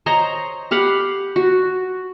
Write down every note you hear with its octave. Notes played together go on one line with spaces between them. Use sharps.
C5 C#5 D#5 A#5
G4 F5 F#5 B5
F#4